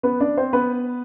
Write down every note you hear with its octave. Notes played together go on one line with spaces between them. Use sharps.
B3 B4
D4 D5
C4 C5
B3 B4